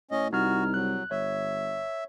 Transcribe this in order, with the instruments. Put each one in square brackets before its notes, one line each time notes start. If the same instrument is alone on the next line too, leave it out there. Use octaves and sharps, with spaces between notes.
[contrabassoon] A2 [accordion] C#4 D#5
[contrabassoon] C2 [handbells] D#4 F6 [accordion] F#4
[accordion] F#3 [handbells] F#6
[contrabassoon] G1 [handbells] C#5 [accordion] E5